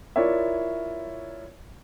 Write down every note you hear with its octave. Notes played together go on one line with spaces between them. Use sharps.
E4 F4 A#4 C#5 D5 E5